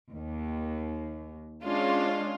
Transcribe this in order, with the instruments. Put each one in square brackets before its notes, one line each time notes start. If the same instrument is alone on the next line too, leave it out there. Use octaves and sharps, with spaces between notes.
[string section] D#2
[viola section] G#3 C#4 D4 [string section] F4